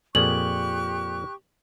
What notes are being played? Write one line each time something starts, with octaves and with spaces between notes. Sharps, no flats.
F2 A#2 G4 G#4 C#6 F#6 F#7